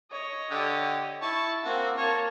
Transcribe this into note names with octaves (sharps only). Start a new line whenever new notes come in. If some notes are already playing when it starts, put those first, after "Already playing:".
C#5 D#5
D3 G4
E4 A5 C#6
A#3 C4 F#4
A#3 C#5 A5